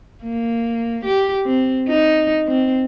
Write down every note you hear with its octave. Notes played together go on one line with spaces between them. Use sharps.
A#3
G4
C4
D#4
C4